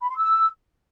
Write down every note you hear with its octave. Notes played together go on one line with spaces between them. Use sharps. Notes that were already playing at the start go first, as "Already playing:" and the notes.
B5
C6
E6